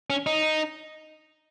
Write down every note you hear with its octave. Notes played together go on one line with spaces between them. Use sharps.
C#4
D#4